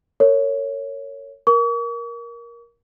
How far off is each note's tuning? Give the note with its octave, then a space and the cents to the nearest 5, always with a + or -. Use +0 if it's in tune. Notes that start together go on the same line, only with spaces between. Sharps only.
A#4 -35 C#5 +0
A#4 +15 C#6 +45